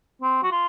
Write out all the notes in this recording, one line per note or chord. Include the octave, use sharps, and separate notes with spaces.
C4
F#4
F4